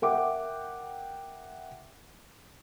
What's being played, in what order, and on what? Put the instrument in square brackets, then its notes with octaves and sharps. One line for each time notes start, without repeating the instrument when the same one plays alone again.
[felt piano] A#4 E5 F#5 G5 D6